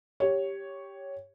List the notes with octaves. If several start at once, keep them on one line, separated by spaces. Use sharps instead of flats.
G4 C#5